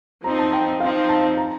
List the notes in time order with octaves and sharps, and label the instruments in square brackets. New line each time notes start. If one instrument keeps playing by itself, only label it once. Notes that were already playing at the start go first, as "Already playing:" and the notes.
[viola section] F3 C4 D#4 [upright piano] A#5
[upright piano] A5
G5
[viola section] F3 C4 D#4 [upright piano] F5
[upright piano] A5
A#5